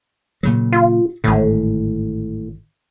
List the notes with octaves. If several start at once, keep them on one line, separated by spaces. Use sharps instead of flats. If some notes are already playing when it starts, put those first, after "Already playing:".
A#2 C#3 F#3
F4
G#1 A2 D3